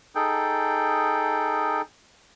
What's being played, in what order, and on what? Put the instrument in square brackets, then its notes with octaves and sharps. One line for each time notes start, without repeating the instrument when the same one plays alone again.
[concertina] D#4 G#4 A4 G5